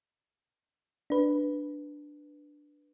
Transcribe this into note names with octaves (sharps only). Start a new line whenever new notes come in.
D4 B4